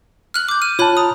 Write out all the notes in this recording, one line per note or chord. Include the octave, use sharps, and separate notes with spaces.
F6 F#6 F#7
D6 G6
F6 D#7
F4 C#5 A5 B5 F#6
A#5 D#6